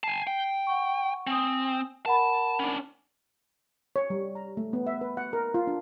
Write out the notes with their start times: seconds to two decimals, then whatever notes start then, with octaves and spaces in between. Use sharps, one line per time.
0.04 G#5 A5 C7
0.27 G5
0.67 F#5 C#6
1.27 C4 G#5 D#6
2.06 A#4 F#5 A5 B5
2.60 C#4 D4
3.96 C#5
4.10 G3
4.35 A#5
4.57 A3
4.73 B3
4.87 E5
5.01 B4
5.17 F#5
5.33 A#4
5.54 F4
5.67 D4